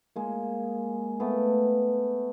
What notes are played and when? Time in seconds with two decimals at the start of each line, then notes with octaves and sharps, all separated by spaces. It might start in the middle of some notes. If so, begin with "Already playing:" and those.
0.16 G#3 A#3
1.20 A3 B3